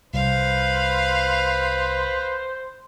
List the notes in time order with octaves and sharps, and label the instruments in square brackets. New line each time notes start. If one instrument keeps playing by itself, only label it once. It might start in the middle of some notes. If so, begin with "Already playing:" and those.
[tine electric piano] C2 [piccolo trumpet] B4 [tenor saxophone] C5 [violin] F5